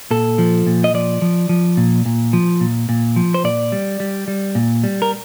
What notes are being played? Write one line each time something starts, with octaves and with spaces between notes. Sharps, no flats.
A#2 A4
F3
A#2
D#5
F3 D5
F3
F3
A#2
A#2
F3
A#2
A#2
F3
C5
A#2 D5
G3
G3
G3
A#2
G3
A#4